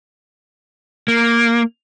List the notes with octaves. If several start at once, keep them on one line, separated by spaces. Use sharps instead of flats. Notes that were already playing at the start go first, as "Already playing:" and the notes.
A#3